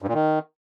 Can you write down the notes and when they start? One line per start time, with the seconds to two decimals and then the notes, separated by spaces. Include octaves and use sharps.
0.02 G2
0.08 A#2
0.14 D#3